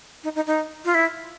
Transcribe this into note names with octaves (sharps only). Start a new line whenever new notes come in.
D#4
D#4
D#4
F4
E4